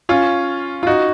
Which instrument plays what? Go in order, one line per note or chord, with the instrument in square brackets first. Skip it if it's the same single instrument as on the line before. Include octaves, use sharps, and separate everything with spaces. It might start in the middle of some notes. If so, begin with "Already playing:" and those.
[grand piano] C#4 F4
F4
D#4 F#4